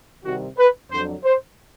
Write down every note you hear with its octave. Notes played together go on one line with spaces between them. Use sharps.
C2 C3 D#3 G3 F#4
B4
F2 D3 F#3 C5
C5